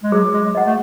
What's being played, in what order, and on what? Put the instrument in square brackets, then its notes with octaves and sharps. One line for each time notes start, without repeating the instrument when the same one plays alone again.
[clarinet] G#3
[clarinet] F#3 [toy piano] G#4
[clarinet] G#3
[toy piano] D#5 F#5
[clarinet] A3